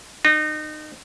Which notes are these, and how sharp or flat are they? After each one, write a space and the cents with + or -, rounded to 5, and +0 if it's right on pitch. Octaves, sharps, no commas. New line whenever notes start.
D#4 -30